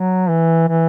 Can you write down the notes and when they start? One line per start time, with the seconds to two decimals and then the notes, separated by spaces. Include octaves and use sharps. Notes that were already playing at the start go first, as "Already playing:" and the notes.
Already playing: F#3
0.29 E3
0.68 E3